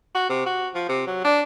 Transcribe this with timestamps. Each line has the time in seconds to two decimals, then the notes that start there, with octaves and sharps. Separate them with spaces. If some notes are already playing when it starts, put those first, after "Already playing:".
0.15 F#4
0.29 C3
0.46 F#4
0.75 F3
0.89 C3
1.07 F#3
1.24 D4